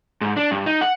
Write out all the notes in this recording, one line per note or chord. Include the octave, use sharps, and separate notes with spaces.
G#2
D4
G2
D#4
F#5